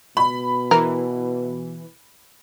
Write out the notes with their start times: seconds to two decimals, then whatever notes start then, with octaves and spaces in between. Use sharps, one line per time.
0.17 B2 B5
0.71 E3 A#4